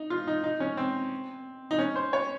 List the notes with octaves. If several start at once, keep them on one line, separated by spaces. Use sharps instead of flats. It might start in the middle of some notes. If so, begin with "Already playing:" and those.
Already playing: D#4
F4
D#4
D#4
C#4
C4
D#4
C#4
C5
C#5